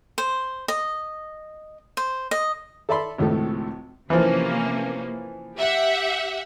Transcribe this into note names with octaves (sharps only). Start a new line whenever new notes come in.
C5
D#5
C5
D#5
A4 D5 E5 A5 B5 C6
G#1 C#2 A2 F3 A4
C3 E3 F3 A#3 C#4
G4 E5 F#5